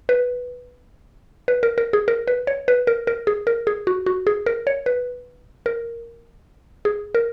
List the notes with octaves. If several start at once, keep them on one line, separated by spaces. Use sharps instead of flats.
B4
B4
A#4
A#4
G#4
A#4
B4
C#5
B4
A#4
A#4
G#4
A#4
G#4
F#4
F#4
G#4
A#4
C#5
B4
A#4
G#4
A#4